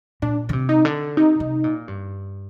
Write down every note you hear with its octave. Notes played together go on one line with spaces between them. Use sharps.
A#2 D4
D3
C3
D#4
D3
C3 D#4
C3
A#2
G2